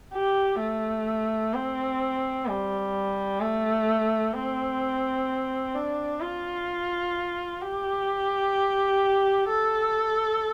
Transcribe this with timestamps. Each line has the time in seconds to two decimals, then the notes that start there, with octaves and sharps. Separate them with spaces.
0.13 G4
0.60 A3
1.54 C4
2.47 G3
3.40 A3
4.33 C4
5.75 D4
6.21 F4
7.62 G4
9.48 A4